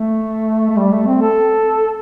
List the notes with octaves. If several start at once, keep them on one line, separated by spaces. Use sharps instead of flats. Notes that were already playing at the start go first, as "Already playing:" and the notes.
Already playing: A3
A3
G3
A3
C4
A4